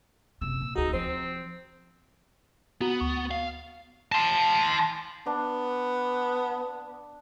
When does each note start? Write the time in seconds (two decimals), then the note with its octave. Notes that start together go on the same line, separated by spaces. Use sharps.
0.41 F#1 C3 E6
0.61 A#2
0.76 D#1 D2 D#4 F#4 G#4
0.93 F3 C4 C5
2.81 B3 F#4 F#5 A#5
3.00 D2 C#6
3.31 F5
4.12 A5 C6
5.26 B3 D4